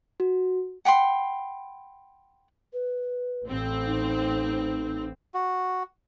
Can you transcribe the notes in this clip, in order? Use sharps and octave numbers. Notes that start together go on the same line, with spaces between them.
F#4
F#5 G5 B5 C6
B4
A1 C4
D#4
F#4